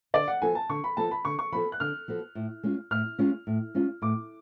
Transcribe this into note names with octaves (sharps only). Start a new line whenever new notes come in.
D3 D5
F#5
F3 B3 F#4 A4 G#5
A5
D3 C#6
B5
F3 B3 F#4 A4 A5
B5
D3 C#6
C#6
F3 B3 F#4 A4 B5
F#6
D3 F6
F3 B3 F#4 A4
A2
G#3 C#4 F4
A2 F6
G#3 C#4 F4
A2
G#3 C#4 F4
A2 D6